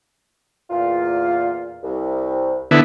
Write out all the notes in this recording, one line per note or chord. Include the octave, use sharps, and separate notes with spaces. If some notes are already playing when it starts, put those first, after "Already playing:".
E2 A#2 F4
C2
D3 B3 E4